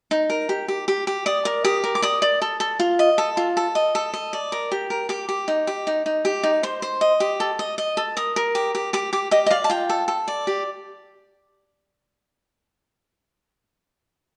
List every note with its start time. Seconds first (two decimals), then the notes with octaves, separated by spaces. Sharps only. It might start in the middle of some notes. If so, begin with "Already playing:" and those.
0.11 D#4
0.30 A#4
0.49 G4
0.68 G4
0.88 G4
1.07 G4
1.26 D5 D#6
1.45 A#4
1.64 G4 D#6
1.84 A#4
1.95 D6
2.02 D5 D#6
2.22 D5
2.42 A4
2.60 A4
2.80 F4
2.99 D#5
3.18 A4
3.37 F4
3.57 A4
3.75 D#5
3.95 A4
4.14 D#5
4.33 D5
4.52 A#4
4.72 G4
4.90 A#4
5.09 G4 D6
5.29 G4
5.48 D#4
5.67 G4
5.87 D#4
6.06 D#4
6.25 G4
6.43 D#4
6.63 C5 C6
6.82 C5
7.01 D#5
7.20 G4
7.40 A4
7.59 D#5
7.78 D#5
7.97 A4
8.17 A#4 D#6
8.36 A#4
8.55 G4
8.75 G4
8.93 G4 D6
9.13 G4 D6
9.31 G4 D#5
9.46 D#5
9.51 D5 F5
9.64 A5
9.70 F4 G5
9.89 A4
10.08 A4
10.28 D5
10.47 G4